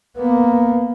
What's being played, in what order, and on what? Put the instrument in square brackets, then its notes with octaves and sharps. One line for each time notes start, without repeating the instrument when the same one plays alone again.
[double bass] A#3 B3